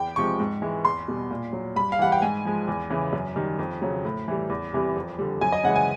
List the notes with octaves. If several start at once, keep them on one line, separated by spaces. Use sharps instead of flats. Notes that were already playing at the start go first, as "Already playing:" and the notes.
Already playing: E2 G5
C3 F3 G#3 C#6
G#2
E3 G#3
E2 C6
B2 G3
A#2
F#3
G2 B5
F5
E3 G3 F#5
G5
G#2 G#5
F3 G#3
E2
C#3 E3
F#2
D#3 G3
F2
C#3 F#3
A2
E3 G3
E2
C3 E3 G3
F2
D3 G3
F#2 G#5
D#5
C#3 E3 G#3 F#5
G#5